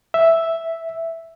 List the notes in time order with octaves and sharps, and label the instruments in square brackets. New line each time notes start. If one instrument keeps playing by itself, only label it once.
[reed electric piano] E5